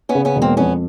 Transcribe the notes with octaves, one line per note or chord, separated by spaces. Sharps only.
B3 C#4
C#3
B3 C#4
E1
A#3 C4
F2 B3 C#4